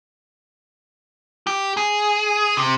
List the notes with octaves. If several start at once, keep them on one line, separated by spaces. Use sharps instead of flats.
G4
G#4
C3